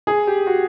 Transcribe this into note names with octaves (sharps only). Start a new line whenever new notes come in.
G#4
G4
F#4